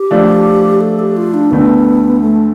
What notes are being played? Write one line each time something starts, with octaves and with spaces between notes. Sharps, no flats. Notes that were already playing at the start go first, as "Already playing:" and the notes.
Already playing: G4
F3 A3 D4 F4
A4
G4
F4
D4
D2 D3 A3 B3
A3